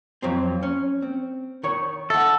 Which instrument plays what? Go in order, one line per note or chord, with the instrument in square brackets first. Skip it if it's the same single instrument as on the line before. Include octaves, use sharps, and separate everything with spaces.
[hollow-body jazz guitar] F2 F#3 C4
C#4
C4
D#3 C#5
[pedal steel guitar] A4 [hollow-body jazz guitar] E5 F#5